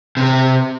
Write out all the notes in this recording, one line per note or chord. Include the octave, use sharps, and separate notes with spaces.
C3